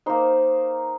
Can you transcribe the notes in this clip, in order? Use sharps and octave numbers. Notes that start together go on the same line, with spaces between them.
A#3 D#4 C5